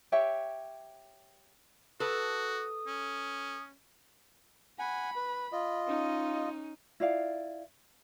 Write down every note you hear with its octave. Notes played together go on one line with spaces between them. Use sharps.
G4 C#5 E5 G5
F#4 A4 B4 D#6
C#4
F#5 G#5 B5
B4
F4 D#5
C#4 D#4
E4 F4 D5 F5